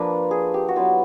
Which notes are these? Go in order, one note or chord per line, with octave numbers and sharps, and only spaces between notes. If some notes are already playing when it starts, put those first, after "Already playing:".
Already playing: F3 A#3 D4 B4
G#4
G4
F#4
F#3 B3 E4 F4